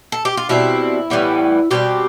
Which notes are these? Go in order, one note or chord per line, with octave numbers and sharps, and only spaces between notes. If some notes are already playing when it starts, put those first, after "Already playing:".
A4
G4
F4
B2 G3 C4 E4
A2 E3 G3 B3
B2 G3 C4 G4